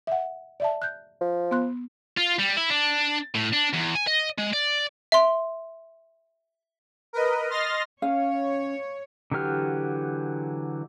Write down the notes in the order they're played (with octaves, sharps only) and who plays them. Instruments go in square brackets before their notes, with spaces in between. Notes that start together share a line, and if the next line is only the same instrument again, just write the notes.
[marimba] E5 F#5
D5 E5 A5
F#6 G6
[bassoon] F3
[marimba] B3 C6 F#6
[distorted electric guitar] F4
G3
E4
D4
A2
D4
E2
G#5
D#5
G#3
D5
[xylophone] E5 C6
[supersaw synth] A#4 B4 D#5
D#5 C6 F6 A6 A#6
[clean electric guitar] C#4 [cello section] C#5 [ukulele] F5
[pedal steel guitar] D3 E3 F#3 G4 F6